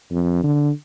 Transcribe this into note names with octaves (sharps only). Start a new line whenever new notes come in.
F2
D3